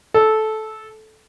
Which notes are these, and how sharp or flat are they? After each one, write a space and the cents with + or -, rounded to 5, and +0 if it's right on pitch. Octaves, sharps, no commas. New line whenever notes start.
A4 -15